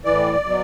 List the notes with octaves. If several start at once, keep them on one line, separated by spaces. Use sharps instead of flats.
A2 E3 D5
B2 F#3